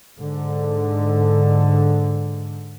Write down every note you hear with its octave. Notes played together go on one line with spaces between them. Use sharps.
G#2 D3